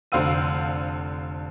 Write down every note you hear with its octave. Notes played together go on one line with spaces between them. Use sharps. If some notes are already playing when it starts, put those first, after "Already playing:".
F1 D3 C5 F5 E6 D#7